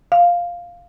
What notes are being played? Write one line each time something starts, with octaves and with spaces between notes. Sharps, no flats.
F5